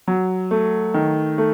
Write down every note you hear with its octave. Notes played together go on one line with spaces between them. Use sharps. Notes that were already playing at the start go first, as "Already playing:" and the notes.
F#3
A3
D#3
A3